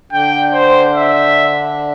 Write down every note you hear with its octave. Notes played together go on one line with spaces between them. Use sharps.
D3 D4 G5
C5
E5